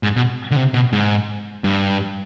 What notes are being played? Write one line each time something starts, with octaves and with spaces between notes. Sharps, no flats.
G#2
B2
D3
C3
B2
G#2
G2